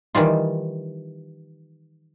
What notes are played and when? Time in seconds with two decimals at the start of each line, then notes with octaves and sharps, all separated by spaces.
0.15 D#3 E3 G3 F4